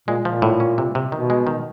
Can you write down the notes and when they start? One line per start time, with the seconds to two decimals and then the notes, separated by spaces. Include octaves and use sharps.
0.08 A#2 G#3
0.23 A#2 F3
0.42 A2
0.60 C#4
0.78 C3
0.95 C3
1.12 B2 D#3
1.30 G#3
1.47 D#3